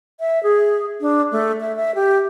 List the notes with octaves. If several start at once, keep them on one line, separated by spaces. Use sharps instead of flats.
E5
G#4
D4
A3
E5
E5
G4